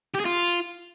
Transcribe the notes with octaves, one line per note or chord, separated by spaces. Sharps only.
G4
G#4
F4